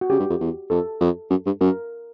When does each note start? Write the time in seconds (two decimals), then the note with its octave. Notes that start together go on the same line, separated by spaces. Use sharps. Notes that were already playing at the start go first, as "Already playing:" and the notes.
0.01 F#4
0.10 C#3 G4
0.19 G2
0.30 F2
0.41 E2
0.70 F2 A4
1.00 F2
1.30 F#2
1.46 G2
1.61 F#2 A#4